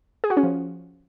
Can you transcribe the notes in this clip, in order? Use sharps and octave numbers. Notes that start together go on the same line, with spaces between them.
G#4
F#4
C#4
F3